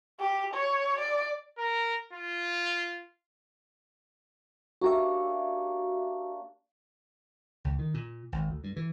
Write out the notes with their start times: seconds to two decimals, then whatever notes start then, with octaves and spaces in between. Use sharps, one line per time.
0.20 G4
0.54 C#5
0.99 D5
1.58 A#4
2.13 F4
4.81 A#3 D4 F#4 G4 C#5 E5
7.64 C#2
7.79 D#3
7.94 A#2
8.32 G#1
8.49 D2
8.64 G2
8.76 E3